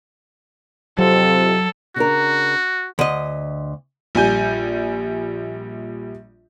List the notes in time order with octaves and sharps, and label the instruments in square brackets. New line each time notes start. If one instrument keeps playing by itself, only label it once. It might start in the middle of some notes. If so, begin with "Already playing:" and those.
[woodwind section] F2 C3 [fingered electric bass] F#3 [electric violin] A4
[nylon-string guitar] C#3 D4 A#4 [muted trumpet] F#4
[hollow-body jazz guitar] D2 D#5
[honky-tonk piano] A#1 G3 G#5 G6